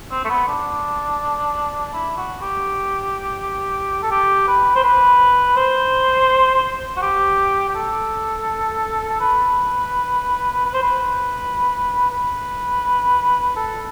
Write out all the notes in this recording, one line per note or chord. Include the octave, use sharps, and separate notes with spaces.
C4
A3
B3
D4
E4
F#4
G4
A4
G4
B4
C5
B4
C5
F#4
G4
G4
A4
A4
B4
B4
C5
B4
B4
A4